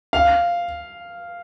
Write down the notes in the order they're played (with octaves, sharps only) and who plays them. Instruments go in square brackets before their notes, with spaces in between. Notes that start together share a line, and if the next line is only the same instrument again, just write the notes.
[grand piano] F5